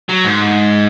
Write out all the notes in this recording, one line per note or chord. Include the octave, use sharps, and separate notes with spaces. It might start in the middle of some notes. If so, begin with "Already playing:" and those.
F#3
G#2